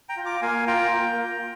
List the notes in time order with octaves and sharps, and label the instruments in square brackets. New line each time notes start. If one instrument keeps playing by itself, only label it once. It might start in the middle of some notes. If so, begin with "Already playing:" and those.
[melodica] G5 A#5
F4
A#5 D6
A#3 F5 G#5
F4 G5 A#5
A#3
F4